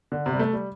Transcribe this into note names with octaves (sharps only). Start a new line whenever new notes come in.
D3
C3
G3
A3
G3